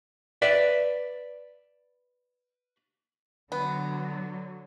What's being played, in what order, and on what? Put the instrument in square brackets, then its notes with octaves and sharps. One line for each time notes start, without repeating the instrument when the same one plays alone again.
[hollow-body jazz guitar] B4 D5 E5
[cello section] D3 F#3 [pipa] B3